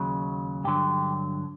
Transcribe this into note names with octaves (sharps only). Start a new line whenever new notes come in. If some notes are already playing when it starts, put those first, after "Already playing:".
Already playing: D#2 C#3 F#3
G2 D3 F#3 G4